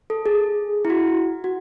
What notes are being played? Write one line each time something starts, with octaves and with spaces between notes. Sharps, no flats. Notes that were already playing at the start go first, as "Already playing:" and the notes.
A4
G#4
E4
F#4
F#4